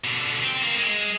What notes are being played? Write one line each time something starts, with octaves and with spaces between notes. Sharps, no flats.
B2 D3
C4
A#3 C4
G#3